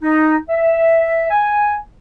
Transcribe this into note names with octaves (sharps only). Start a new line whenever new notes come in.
D#4
E5
G#5